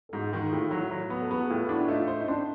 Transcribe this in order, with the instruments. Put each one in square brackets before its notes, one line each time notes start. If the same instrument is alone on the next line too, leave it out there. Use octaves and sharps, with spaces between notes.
[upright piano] A4
[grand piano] G#2 [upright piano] F#4 G#4
[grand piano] D#3 [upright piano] F#4 G#4
[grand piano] A2 [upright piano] F4 G4
[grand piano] F#3 [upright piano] E4 F#4
[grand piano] F#3
B3
[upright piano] A4
[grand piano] B3 [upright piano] F#4 G#4
[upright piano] G#4
[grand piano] A2 [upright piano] F4 G4
[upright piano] G4
[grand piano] D4 [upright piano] E4 F#4
[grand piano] A3 [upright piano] D#4 F4
[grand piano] C5
[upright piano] D#4
[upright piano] C4 D4 [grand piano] C5